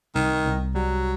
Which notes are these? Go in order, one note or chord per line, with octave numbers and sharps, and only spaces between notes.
C2 D#3
C2
F#3 G3